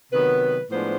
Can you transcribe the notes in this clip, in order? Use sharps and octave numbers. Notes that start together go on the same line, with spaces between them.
C3 D#3 F#3 B3 B4
A2 F3 G#3 B3 D4 C5